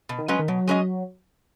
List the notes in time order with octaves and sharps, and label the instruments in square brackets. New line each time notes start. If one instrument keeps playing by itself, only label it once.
[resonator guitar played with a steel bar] B2
[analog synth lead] D#3
[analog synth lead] F#3 [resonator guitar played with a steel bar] G#3 C#4 B4 D#5
[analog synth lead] D#3
[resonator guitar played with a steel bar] B2 [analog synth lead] F#3
[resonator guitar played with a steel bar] G#3 C#4 B4 D#5